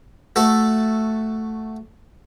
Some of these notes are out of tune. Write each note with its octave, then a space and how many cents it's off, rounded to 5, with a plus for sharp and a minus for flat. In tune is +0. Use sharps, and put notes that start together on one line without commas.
A3 +0 F#4 +0 A4 +0